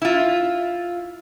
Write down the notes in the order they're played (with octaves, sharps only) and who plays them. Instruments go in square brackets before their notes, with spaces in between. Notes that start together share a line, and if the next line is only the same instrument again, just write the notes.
[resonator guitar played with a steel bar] E4 F4